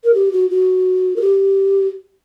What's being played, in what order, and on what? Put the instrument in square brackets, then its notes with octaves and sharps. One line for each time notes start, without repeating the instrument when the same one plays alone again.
[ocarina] A#4
G4
F#4
F#4
A#4
G4